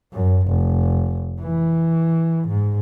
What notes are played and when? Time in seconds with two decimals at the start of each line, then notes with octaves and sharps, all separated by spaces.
0.13 F#2
0.48 F1
1.41 E3
2.49 G#2